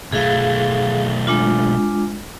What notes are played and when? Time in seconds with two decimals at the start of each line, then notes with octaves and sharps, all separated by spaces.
0.12 B1 A3 G#4 F5
1.27 G#3 D4 F4